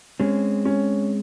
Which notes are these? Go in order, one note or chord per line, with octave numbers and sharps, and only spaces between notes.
G#3 C4 C#4
C#4